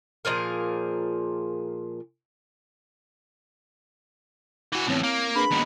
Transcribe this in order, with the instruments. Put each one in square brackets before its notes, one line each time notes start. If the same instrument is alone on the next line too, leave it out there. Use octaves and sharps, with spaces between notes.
[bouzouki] A#2 F3 G#4 A#4
[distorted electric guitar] E3 F#4 [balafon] E4 G#5
[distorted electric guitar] E2 A2 [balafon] C4 C#5
[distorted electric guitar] A#3
[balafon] D4 G#4 B4 [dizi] B5
[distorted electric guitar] D#2 B2 [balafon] D#5 A#5